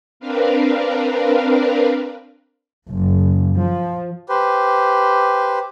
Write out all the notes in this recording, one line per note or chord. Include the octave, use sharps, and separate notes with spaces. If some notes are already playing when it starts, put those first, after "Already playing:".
C4 D4 A#4 B4 F5
F#1
F3
G4 B4 C5